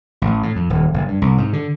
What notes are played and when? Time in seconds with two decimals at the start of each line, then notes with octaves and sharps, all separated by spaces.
0.22 A1
0.43 A2
0.56 F2
0.70 D#1
0.94 F#1
1.08 G2
1.22 C2
1.38 G#2
1.53 D3